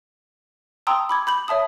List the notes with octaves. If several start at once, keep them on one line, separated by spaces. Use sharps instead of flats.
G5 A5 A#5 C6 D#6 E6
B5 D6 G#6
B5 G6 F#7
C#5 E5 A5 D#6